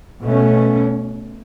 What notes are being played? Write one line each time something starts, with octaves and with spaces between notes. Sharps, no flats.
B2 A3 C#4